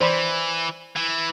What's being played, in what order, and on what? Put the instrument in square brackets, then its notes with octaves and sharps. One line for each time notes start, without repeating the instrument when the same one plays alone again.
[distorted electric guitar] E3 [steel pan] C5 D5 B5
[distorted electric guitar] E3